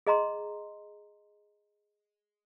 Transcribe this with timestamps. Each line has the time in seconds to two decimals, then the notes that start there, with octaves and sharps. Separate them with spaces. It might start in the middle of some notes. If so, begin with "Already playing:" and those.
0.07 G#4 D#5 A#5 C6